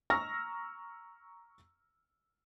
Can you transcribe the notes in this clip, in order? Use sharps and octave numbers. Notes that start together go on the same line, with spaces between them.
A#5 C#6 E6 F6 A#6